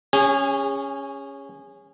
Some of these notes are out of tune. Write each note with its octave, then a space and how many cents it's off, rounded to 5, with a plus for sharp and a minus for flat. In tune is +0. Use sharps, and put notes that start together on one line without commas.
C#4 +0 G#4 -30